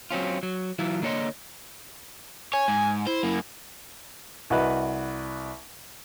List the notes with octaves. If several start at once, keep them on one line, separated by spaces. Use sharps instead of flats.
F#3 C4 C#4 F4
F#3
E3 F#3 E4 F4
D3 A#3 F4 C#5 D#5 C6
C#5 G#5
G#2
E4 C5
F#2 A#3
C2 F#4 B4 D#5